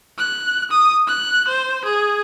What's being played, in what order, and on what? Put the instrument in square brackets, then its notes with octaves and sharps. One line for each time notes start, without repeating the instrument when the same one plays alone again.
[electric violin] F#6
D#6
F#6
C5
G#4